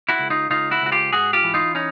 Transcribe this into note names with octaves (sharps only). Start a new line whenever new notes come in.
E4 F#4
C#2
D#4 F4
C#2 D#4 F4
E4 F#4
C#2 F#4
F4 G4
G#2 F#4 G#4
F4 G4
E3
D#4 F4
C#4 D#4